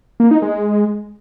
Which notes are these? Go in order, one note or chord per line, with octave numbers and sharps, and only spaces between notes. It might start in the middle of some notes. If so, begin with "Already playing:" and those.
A#3
D#4
G#3